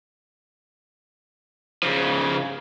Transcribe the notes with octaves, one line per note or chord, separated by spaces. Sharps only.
C#3 F3